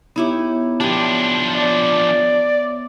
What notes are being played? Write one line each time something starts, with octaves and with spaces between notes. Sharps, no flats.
B3 D#4 E4 G4 C#5 E5
F3 D4 G4 G#5
D5